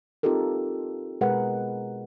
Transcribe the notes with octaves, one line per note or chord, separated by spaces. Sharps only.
C4 D#4 F4 G4 A4 A#4
B2 G#3 G#4 A#4 B4 F#5